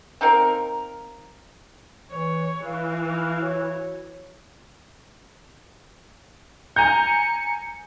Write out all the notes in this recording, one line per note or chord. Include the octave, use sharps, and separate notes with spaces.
C4 D#4 F4 A#4
E3 C#5
E3 B4 F5
E4 F5
F#4 C#5
G#5 A#5 G6 C#7